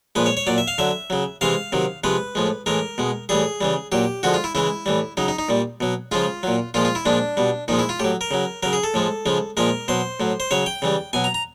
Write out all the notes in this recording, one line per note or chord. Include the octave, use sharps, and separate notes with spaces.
A#2 F3 G#3 B4
C#5
C#5
A#2 F#3 D5
E5
F5
D3 F#3 E5
C#3 F#3
C3 E3 G#3 F5
C3 D#3 F#3
C3 F3 G#3 B4
A2 F3 G#3
A2 E3 G#3 A#4
B2 G#3
A2 E3 G3 G#4
C#3 E3 G3
A#2 F#3 G4
D3 F3 G#3 F#4
F4
E4
C#3 E3 G#3 E4
A2 E3 G3
C#3 F#3 D#4
D#4
D#4
A#2 G3
B2 F#3
C#3 F3 G#3 F4
A#2 F#3
A#2 F3 G#3 F4
F4
E4
A#2 F3 G#3 D4
B2 G3
A#2 F3 G#3 D#4
E4
F4
A2 F#3 G4
A#4
C#3 F#3
C#3 F#3 A#4
G#4
A4
A2 F3 G#3
C#3 F3 G#3
A#2 F3 G#3 A#4
B2 F#3 C5
A2 F#3
C5
C#3 F#3 C#5
G5
C#3 E3 G3
B2 F#3 G#5
A#5
A#5